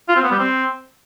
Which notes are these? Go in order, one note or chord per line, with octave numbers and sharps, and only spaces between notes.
F4
C4
B3
G3
C4